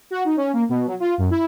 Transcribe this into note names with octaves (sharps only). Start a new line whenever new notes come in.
F#4
D#4
C#4
A#3
B2
F#3
F4
F#2
E4